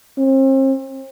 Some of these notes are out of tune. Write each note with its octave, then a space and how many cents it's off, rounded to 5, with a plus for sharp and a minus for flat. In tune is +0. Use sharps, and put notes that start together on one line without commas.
C4 +40